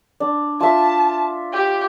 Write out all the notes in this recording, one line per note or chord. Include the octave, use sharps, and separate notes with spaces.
D4
F4 E5 A5
G4